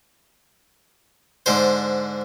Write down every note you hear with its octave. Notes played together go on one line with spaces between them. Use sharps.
G#2 D3 C5